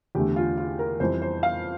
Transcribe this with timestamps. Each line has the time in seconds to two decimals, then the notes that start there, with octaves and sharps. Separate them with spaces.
0.15 E2 D3 A3 G4
0.36 F4
0.57 F4
0.79 A#4
1.00 F2 E3 G3 C5
1.22 C5
1.43 F5